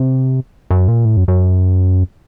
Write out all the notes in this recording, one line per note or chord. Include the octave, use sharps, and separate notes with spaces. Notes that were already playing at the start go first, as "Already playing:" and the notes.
Already playing: C3
F#2
A#2
A2
F#2
F#2